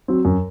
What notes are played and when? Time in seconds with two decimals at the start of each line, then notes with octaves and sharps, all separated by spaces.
0.08 F#3 C4
0.25 F#2